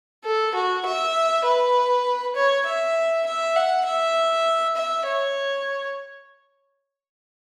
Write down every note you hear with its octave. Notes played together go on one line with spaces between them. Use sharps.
A4
F#4
E5
B4
C#5
E5
E5
F#5
E5
E5
C#5